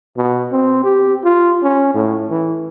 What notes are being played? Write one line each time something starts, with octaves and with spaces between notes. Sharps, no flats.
B2
C4
G4
F4
C#4
A2
E3